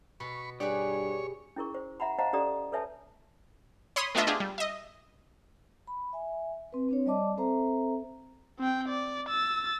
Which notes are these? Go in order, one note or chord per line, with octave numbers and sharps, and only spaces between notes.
B2 B5 C#6
G2 G4 G#4 B4 C#5 D5
C#4 E4 G#4 A#4 C#6
C5
E5 F#5 A#5 B5
C5 D#5 F5 F#5 A5 A#5
C#4 G4 A4 D5 A#5 D#6
A4 B4 C#5 E5 G#5 A5
C#5 B5 C6 D#6
A3 B3 D4 F4 D#5 E5
D4 F4 G4 G#4
G3
D#5 E5
B5
E5 G#5
C4 B4
C4 D4 C#5
G3 D5 D#5 A5 D6
C4 A4 C5 E5 A#5
C4 G5
D5
E6 A6